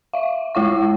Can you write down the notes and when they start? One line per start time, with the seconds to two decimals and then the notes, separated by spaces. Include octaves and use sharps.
0.13 E5 F5
0.55 G#3 E4 F5 C#6